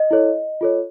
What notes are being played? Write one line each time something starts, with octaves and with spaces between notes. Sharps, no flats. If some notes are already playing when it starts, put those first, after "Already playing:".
Already playing: D#5
E4 A4 C#5
F4 A4 C#5